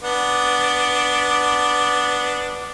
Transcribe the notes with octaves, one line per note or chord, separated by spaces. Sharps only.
B3 D4